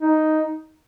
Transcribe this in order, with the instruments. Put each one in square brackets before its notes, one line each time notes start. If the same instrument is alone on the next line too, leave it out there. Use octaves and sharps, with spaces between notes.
[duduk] D#4